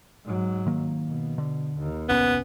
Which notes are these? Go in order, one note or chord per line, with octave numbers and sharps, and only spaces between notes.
G#2 F#3
D#3 A#3
B2
D3
D#2
F1 C2 B3 C#4